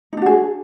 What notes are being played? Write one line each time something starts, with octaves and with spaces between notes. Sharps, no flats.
D4 D#4 F#4 G#4